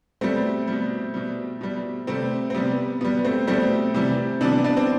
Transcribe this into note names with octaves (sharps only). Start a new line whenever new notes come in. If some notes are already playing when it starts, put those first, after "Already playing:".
B2 G3 A3 C4
B2 G3
B2 G3
B2 G3
C3 G3 A3 C4
C4
C3 G3 B3
B2 G3 B3
A3 C4
B2 G3 A3 C4
C3 E3 G3
C3 E3 G3 B3 D4
B3 D4
C4